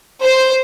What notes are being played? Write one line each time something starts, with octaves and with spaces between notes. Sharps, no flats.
C5